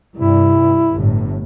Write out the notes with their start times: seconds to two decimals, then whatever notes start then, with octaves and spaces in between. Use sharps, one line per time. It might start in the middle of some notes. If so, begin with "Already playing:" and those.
0.16 G2 C3 E4
0.92 G1 A2